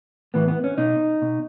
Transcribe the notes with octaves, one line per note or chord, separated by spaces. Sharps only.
A2 E3 B3
B3
C#4
B2 D#4
B2